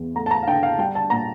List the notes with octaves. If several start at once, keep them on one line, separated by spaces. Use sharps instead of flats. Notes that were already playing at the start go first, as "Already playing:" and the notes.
Already playing: E2 E3
A3 A#5
A5
A#5
F5
D3 G5
F5
G3 G5
A5
A#2 A#5